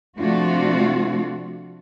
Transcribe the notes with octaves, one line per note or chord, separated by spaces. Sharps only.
C3 F3 A3 D4 F4 F#4